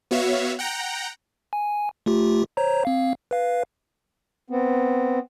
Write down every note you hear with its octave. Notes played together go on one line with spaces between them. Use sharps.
B3 F#4 C#5 E5 F5
F#5 G5 A#5
G#5
A3 F4 G4
C5 C#5 A#5
C4 F5
B4 F5
B3 C4